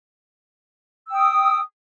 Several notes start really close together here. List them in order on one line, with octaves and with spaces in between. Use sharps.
E6 G5 D#6